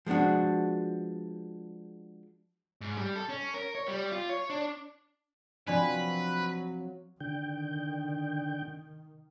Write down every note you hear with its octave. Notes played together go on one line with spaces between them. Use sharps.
F3 G#3 B3 D4 F#4
G#2
G3
A4
C#4
A#4
C#5
G3
F4
C#5
D4
F3 F#3 C4 D4 B4 D5 B5
D3 D#3 G5